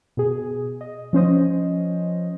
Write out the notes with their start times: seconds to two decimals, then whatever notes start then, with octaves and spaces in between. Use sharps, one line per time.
0.17 B2 G#4
0.81 D#5
1.13 F3 C#4 C5 D#5